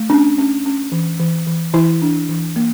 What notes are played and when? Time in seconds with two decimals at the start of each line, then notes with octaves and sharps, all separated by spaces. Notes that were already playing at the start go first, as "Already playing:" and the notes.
Already playing: A3
0.10 C#4 D4
0.38 C#4
0.66 C#4
0.92 E3
1.20 E3
1.47 E3
1.74 E3 E4
2.02 D4
2.29 E3
2.56 A#3